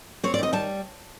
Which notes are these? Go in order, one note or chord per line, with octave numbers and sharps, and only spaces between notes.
C4 C#5
D5
D#3 D#5
G3 A5